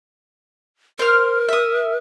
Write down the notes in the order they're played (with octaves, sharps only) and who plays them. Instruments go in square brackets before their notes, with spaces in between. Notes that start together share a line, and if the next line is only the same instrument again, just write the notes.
[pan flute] A#4 [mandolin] C5 F6
[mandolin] E5 D#6